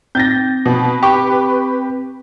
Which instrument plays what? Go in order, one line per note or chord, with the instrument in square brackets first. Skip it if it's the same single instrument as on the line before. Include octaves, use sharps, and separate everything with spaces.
[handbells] C4 [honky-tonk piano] G6 A6 A#6
[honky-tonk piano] B2 [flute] B4
[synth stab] G4 [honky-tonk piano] C#6